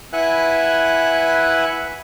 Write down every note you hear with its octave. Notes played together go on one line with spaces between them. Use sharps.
E4 B4 E5 F#5 G#5 F#6